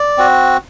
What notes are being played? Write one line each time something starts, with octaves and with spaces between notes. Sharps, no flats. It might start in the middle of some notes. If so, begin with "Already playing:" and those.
Already playing: D5
C4 F#4